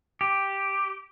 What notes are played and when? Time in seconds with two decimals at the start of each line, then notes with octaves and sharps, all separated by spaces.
0.21 G4